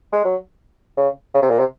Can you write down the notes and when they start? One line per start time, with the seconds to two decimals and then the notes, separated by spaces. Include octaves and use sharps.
0.13 G#3
0.25 F#3
0.97 C#3
1.34 C#3
1.42 C3
1.50 A#2
1.59 C3